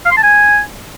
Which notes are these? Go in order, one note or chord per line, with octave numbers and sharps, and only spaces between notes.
F5
C6
A5
G#5